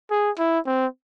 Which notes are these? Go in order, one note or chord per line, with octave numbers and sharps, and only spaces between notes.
G#4
E4
C4